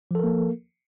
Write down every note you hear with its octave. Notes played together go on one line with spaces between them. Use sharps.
F3 A#3 A4 A#4